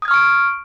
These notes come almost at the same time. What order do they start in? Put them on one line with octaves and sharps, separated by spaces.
D#6 G#6 F6 C#6 D7